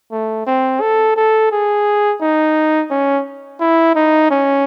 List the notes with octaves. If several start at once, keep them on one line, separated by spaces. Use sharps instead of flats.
A3
C4
A4
A4
G#4
D#4
C#4
E4
D#4
C#4